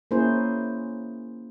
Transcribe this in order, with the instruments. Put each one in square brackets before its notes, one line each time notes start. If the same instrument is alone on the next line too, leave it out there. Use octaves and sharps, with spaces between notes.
[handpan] A#3 C#4 E4 G#4 C5